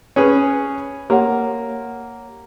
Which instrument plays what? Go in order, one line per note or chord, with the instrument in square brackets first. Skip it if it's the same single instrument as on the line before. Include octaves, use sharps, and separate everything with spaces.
[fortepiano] C#4 G#4 B4
[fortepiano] A#3 [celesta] G4 C#5 F#5